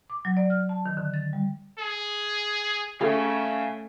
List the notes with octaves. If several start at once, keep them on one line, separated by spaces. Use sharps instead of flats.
D6
F#3
D5
F6
A5
D#3
D3
A6
G3
G#4
A3 C#4 G#4 A4 C#5 E5 F5 G#5